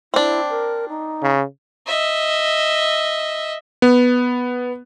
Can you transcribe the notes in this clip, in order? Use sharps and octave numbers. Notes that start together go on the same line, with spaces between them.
C4 D4 E4
A#4
D#4
C#3
D#5 E5
B3